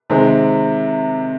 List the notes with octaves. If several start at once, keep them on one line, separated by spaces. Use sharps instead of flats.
C3 D#3 G#3 C4